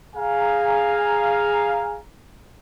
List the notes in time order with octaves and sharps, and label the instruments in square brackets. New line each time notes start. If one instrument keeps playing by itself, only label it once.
[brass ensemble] G#4 F5 G#5 A#5